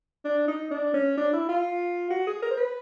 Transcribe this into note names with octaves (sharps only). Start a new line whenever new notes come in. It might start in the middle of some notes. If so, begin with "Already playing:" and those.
D4
D#4
D4
C#4
D4
E4
F4
F#4
G#4
A#4
C5
B4